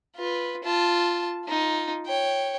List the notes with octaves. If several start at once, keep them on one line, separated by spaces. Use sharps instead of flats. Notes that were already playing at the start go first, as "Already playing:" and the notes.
F4 B4
F4 A5
D#4 F4
C#5 G5